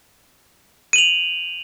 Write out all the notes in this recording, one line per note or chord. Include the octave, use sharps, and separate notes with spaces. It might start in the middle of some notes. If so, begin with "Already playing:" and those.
D#7 F7 F#7